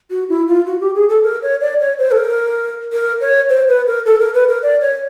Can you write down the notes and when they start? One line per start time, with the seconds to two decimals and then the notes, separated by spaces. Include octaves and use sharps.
0.11 F#4
0.29 E4
0.48 F4
0.67 F#4
0.81 G4
0.95 G#4
1.09 A4
1.23 A#4
1.43 C#5
1.61 D5
1.80 C#5
1.99 C5
2.11 A4
2.18 A#4
2.93 A#4
3.21 C#5
3.49 C5
3.68 B4
3.87 A#4
4.06 A4
4.20 A#4
4.34 B4
4.49 A#4
4.63 D5
4.81 C#5